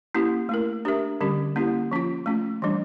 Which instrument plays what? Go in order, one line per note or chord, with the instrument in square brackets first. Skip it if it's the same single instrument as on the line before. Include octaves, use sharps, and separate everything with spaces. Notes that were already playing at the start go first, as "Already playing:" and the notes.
[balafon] A#3 C#4 E4 G4
A3 E4 A#4
D4 G4 A#4 E5
D3 G3 C#4 G4
A#3 C#4 E4 G4
F3 C#4 F4
A3 C#4 F4
E3 G3 D4